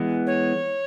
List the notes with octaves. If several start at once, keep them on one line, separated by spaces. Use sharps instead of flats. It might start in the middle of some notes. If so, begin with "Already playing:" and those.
Already playing: E3 G#3 B3
C#5